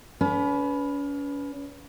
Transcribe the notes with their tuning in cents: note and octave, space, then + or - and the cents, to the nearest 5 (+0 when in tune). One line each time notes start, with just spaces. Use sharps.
C#4 +40 B4 +0